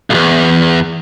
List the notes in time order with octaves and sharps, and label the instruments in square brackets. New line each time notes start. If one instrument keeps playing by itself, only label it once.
[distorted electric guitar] B1 E2